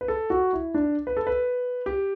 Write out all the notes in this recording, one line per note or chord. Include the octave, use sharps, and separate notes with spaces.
B4
A4
F#4
E4
D4
B4
A4
B4
G4